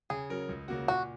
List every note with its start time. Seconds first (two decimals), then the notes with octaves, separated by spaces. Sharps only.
0.10 C#3 G#4
0.30 F#3 C#4 A#4
0.49 C#2
0.68 C#3 A#3 F#4
0.88 A#2 F#4